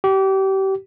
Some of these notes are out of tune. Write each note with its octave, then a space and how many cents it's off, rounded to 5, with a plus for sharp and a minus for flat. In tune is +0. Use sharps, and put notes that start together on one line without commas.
G4 -30